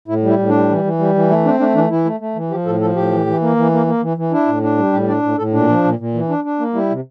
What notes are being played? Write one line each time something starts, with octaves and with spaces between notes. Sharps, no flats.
A2 E4
G3
E4
A2
G3 D4
E3
E3
G3
E3
A3 E4
C4 D4
A3 D4
E3 D4
E3 E4
A3
A3
E3
F3 G4
A2 A4
F3 A4
A2 G4
E3
E3
A#3
E3
A#3
A#3
E3
E3
D4 E4
A2
D4
G3
A2 G4
D4 D5
A2
A2 A4
A#2 D4
F3
A#2
A#2
E3
D4
D4
A#3
G3 E4
C3